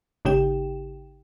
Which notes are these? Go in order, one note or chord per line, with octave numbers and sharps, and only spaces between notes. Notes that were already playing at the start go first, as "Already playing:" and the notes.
G#1 C#3 D#4 G4 G5 E7